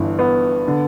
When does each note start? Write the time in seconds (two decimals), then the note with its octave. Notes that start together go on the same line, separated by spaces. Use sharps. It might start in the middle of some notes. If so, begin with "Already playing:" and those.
Already playing: G1 G2 E3
0.19 B3
0.68 D3